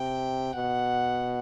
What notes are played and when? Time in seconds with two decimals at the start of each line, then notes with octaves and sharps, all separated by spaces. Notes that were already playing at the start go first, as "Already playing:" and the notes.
Already playing: C3 G5
0.55 B2 F#5